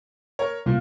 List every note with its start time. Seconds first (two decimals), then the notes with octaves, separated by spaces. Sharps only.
0.39 A#4 C#5
0.66 C2 A#2 A#3